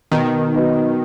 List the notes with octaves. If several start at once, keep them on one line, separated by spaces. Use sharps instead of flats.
B2 D#3
F#3 B3 D#4